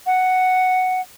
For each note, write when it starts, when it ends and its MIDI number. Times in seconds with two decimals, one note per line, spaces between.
0.06 1.01 78